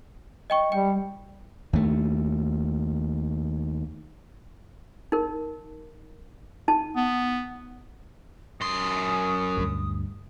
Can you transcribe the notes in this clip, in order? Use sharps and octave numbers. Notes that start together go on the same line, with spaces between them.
D#5 G5 C#6
G3 G5
D#2 A3
D#4 A#4
D#4 A5
B3
F#2 C6 D#6
D2 G2